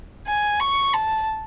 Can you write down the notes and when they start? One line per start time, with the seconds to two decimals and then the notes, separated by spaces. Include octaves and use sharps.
0.27 G#5
0.60 C#6
0.93 A5